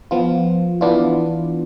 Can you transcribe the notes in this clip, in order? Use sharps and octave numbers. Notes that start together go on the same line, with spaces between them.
F3 B3 F4
E3 B3 D4 F4